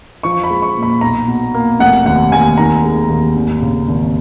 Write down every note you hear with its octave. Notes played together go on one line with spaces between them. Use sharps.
F3 C#6
B5
G#3
C#6
A#2
B5
B1 A#5
B2
A#3
F1 F#5
D#2 F#5
D#2 G#5
D#3 A#5
G#3
D#2
G#1
C#3
G#1